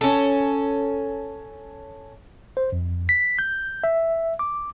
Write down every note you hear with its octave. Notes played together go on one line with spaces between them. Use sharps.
C#4 A4
C5
F2
B6
G6
E5
D6